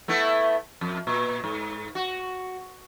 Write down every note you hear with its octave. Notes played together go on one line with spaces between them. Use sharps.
A3 B3 E4
F2
A#2
G#2
F#4